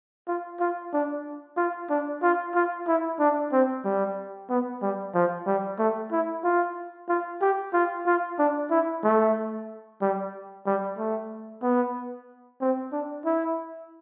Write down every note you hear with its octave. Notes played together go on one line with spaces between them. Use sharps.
F4
F4
D4
F4
D4
F4
F4
E4
D4
C4
G3
B3
G3
F3
G3
A3
E4
F4
F4
G4
F4
F4
D4
E4
A3
G3
G3
A3
B3
C4
D4
E4